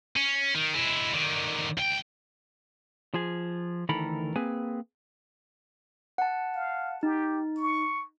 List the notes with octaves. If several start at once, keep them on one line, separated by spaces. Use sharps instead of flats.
C#4
D#3
G#3 E4
D3 D#3
C#2 G5
F3 G#4
D2 D#3 E3 A4 A#4 B5
A#3 C4 G#4 B4 G#5
F#5 A5
F5
D#4 G4
C#6